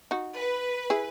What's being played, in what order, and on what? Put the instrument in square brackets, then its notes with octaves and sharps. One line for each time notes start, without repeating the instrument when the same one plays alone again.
[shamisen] D#4 F#4
[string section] B4
[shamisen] E4 G#4